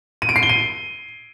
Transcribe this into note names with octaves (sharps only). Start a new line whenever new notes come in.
D#7
D7
C7
G7
D#7